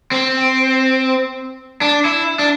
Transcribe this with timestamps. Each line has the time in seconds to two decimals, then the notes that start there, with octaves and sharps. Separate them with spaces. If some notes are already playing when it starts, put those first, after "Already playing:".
0.12 C4
1.81 D4
2.05 E4
2.39 D4